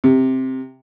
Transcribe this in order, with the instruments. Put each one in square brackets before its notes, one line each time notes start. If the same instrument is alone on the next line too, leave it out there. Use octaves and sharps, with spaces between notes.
[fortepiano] C3